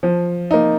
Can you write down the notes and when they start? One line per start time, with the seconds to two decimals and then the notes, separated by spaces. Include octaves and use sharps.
0.03 F3
0.51 A#3 D#4